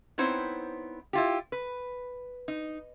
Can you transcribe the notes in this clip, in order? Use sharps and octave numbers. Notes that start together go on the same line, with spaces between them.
B3 C4 D#4 E4 C5 C#5
E4 F4 G4
B4
D#4